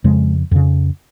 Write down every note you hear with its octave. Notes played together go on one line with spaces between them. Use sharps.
F2 C#3 G#3
F2 C#3